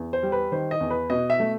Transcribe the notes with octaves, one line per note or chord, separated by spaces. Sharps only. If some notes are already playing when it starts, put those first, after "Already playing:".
Already playing: E2
C5
G3
B4
D#3 C5
D#5
E2
B4
B2 D#5
E5
A3